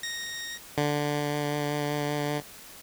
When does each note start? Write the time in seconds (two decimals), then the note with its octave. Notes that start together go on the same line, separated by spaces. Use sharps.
0.03 A#6
0.78 D3